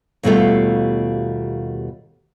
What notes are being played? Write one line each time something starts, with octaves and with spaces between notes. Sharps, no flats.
D#2 B2 G3 A3 F4